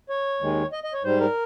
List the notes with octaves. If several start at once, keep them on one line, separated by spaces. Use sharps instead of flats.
C#5
D#2 D#3 G#3
D#5
D#5
C#5
G#2 G3 C5
A#4